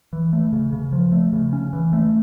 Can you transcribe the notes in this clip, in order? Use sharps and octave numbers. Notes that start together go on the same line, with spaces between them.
E3
A3
C#3
C#3
F3
A3
C#3
C#4
E3
A3